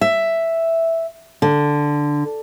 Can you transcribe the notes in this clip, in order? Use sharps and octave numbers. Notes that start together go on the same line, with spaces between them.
E5
D3